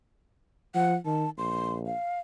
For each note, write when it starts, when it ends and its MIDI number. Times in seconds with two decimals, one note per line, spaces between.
0.75 0.96 53
0.75 0.95 78
1.06 1.26 51
1.06 1.30 81
1.38 1.91 34
1.38 1.74 84
1.86 2.19 77